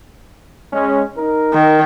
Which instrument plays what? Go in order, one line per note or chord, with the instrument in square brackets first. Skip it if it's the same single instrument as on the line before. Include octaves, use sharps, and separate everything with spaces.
[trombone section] G#3 C#4
D#4 A#4
[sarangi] D#3